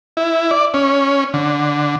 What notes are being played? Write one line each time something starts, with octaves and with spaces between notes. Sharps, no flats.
E4
D5
C#4
D3